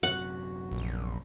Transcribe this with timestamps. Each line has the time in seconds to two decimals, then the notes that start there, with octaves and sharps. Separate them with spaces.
0.03 F#2 C3 F#4 F#5
0.72 A#1